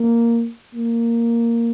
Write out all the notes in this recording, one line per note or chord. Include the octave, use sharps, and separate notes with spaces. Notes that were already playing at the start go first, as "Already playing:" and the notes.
Already playing: A#3
A#3